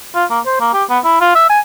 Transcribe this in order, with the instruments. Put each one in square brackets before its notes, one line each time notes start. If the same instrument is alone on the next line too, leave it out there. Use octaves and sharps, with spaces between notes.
[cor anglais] F4
A#3
C5
A#3
G4
B3
E4
F4
E5
G#5